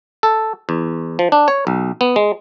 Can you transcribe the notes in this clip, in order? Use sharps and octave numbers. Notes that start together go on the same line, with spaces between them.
A4
E2
F3
D4
C#5
B1
B3
G#3